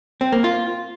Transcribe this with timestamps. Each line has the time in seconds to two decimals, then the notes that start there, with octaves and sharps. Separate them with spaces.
0.21 C4
0.32 A#3
0.44 F4